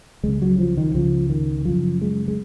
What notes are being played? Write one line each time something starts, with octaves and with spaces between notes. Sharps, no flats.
C#2 C#3 G#3
F#3
F3
D#3
C#2 C#3 F3
D#3
F#2 C#3 F3
G#3
G#3